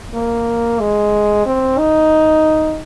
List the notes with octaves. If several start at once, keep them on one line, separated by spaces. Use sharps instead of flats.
A#3
G#3
C4
D#4